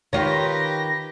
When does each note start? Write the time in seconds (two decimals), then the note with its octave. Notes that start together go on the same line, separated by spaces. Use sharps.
0.13 D#3 F4 G4 B4 C#5 A#6